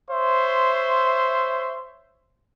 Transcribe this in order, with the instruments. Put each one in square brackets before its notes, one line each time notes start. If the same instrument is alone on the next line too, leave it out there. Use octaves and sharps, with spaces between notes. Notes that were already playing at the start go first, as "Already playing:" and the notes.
[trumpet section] C5 C#5 E5 C6